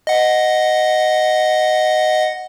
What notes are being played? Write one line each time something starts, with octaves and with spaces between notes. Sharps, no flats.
D#5 F#5